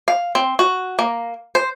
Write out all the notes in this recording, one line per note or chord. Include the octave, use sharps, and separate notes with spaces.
F5
C4
F#4
A#3
C5